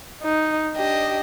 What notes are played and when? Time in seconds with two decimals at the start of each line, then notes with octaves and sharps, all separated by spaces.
0.23 D#4
0.77 D4 G4 D#5